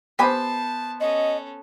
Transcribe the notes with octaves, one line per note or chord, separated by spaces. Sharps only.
B3 G4 C5 G#5 A5 B5
C#4 A4 D#5